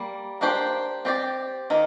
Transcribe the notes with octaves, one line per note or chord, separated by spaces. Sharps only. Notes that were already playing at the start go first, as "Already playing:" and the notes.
Already playing: G3 A#3
A#3 D4 G4 C5
C4 G4 D5
D#3 A#3